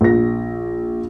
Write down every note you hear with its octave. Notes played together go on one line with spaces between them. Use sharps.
A#1 A#6